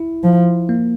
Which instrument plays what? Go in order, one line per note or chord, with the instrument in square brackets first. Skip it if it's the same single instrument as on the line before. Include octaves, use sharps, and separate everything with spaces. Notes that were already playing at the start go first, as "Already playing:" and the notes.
Already playing: [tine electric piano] E4
[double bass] F3
[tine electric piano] A#3